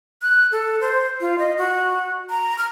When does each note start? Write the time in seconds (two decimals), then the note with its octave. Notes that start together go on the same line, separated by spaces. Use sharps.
0.22 F#6
0.52 A4
0.81 C5
1.21 F4
1.39 D#5
1.58 F#4
2.30 A#5
2.58 F6